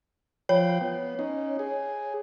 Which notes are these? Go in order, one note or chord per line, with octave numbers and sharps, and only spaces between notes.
F3 C#5 G5
B3
C#4 D#4
G#4